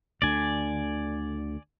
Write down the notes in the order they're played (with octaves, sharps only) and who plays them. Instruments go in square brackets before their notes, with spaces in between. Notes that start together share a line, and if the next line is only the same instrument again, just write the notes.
[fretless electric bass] D2 D3 [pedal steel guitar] D5 G#5